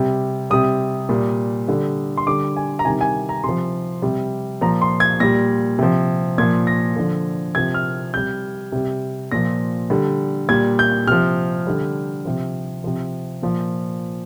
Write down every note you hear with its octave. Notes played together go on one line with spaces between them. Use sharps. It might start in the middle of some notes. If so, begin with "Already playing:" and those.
Already playing: C3 G3
C3 G3 D#6
A#2 G3
D3 G3
C6
D3 G3 D6
G#5
A#5
C3 D#3 G3 G#5
G#5
A#5
C3 C6
F3
C3 G3
A#2 F3 A#5
C6
G#6
A#2 G3 A#6
C3 F3
A#2 F3 G#6
A#6
D3 F3
C3 F3 G#6
F6
C3 G3 G6
C3 G3
A#2 F3 A#6
D3 G3
A#2 G3 G#6
G6
C3 F3 F6
D3 G3
C3 F3
C3 F3
A#2 F3